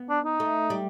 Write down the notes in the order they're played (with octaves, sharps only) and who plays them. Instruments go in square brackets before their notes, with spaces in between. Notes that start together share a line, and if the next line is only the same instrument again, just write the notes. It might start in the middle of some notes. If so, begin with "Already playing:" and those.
Already playing: [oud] B3
[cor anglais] D4
D#4
[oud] A3
G3